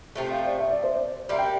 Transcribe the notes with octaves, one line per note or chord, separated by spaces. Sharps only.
C3 F3 A3
F5
D5
E5
D5
C5
D5
C3 G3 A#3 E5
G5